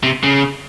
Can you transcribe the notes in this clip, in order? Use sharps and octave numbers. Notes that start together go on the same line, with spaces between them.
C3
C#3